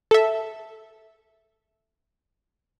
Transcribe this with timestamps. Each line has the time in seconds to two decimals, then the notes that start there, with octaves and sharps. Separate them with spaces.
0.11 A4 E5